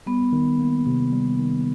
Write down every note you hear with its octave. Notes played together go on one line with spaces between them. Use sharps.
G3 B3
D#3
A#3
C3
G3
D#3